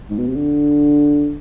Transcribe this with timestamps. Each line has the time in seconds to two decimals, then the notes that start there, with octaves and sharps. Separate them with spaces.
0.10 G#2
0.18 B2
0.27 C3
0.36 D3